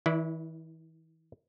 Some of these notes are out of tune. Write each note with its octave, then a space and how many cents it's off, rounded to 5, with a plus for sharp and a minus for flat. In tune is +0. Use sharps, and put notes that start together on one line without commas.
E3 -40 E4 +0 D5 +0